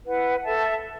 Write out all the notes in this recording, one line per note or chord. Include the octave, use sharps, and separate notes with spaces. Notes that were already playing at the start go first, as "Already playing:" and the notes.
E4 B4 F#5
A4 E5 A5